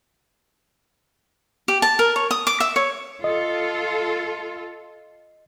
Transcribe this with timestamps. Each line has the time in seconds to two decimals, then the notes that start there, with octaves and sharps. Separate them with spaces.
1.68 G4
1.82 A5
1.99 A#4
2.16 C#5
2.31 D#6
2.47 D6
2.60 E5
2.76 C#5
3.24 F4 A4 D#5